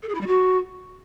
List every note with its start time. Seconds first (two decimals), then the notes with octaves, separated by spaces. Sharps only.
0.03 A4
0.09 G#4
0.15 E4
0.21 G3
0.27 F#4